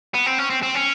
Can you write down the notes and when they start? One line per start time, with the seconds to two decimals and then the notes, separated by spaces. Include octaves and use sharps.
0.14 B3
0.26 C4
0.38 C#4
0.50 C4
0.63 C4
0.75 C#4